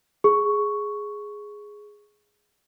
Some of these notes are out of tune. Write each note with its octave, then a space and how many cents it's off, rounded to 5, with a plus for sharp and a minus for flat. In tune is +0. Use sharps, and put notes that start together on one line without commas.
G#4 +0 C#6 +5